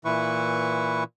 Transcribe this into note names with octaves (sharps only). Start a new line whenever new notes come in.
A#2 E3 E4 B4 C#6